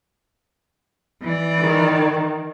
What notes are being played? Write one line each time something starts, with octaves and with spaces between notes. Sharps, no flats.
E3 D5
D#3